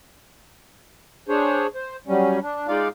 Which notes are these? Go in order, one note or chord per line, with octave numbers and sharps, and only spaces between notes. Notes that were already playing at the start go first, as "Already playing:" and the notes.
D4 G#4 C5 C#5
C5
F#3 G3 C#4
D4
G#3 D#4 F4 D5 F5